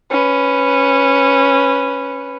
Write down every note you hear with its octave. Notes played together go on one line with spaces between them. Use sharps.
C#4 B4